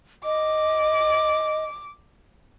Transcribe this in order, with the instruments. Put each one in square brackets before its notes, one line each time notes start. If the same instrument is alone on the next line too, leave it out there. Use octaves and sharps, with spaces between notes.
[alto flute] D#5 [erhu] D6